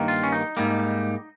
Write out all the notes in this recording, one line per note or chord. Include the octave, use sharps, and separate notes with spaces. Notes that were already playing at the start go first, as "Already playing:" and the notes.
Already playing: G2 D#3 A#3
F4
C#4
D#4
G#2 G3 A#3